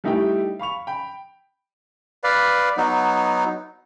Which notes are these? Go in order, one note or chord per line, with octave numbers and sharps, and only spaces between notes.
G3 A3 D#4 E4 G4 G5
F5 B5 C#6 F7
G5 B5
B4 D5 F5
F#3 B3 D#4